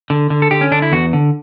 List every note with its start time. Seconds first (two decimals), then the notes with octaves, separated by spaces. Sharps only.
0.10 D3
0.30 D3
0.42 A4
0.51 D3 G4
0.61 C#4
0.72 D3 D4
0.82 E4
0.92 E2 F#4
1.13 D3